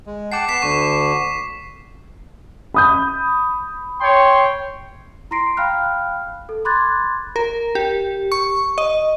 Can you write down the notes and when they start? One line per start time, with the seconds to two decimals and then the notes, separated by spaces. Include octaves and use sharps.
0.06 G#3
0.32 F#5 G5 A5 D6 C7
0.48 B3 B6 C7 E7
0.62 D2 D3 C#6
2.74 B5 D#6 G6
4.01 C#5 G5 C6
5.31 E4 A#5 C6 A#6 C7 D7
5.57 F5 G5 B5 F6 F#6
6.49 A4
6.65 B5 C6 D6 F#6 G#6 A6
7.36 A#4
7.75 G4
8.32 C#6
8.78 D#5